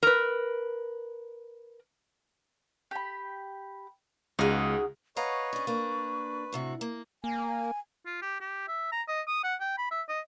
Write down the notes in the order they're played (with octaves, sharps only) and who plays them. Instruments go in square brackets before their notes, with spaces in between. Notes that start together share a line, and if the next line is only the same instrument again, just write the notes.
[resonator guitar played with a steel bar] A#4 B4
[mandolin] G4 B5
[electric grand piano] C#2 [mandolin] D#4 F#4 [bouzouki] G#4 F5
[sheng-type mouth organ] B4 C#5 D#5 [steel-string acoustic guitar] F5 F#5 A#5 [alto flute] C#6
[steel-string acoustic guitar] C#4 D4
[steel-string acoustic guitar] A#3 D4 [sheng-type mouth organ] B4
[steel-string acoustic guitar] A2 C3 F#4
A#3
[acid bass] A#3 [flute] G#5
[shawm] F4
G4
G4
E5
A#5
D#5
D#6
F#5
G5
B5
E5
D#5